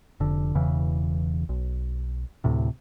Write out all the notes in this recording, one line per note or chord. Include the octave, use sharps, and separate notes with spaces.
F1 D3
E1 E2 C#3 E3
B1
D2 A2 C3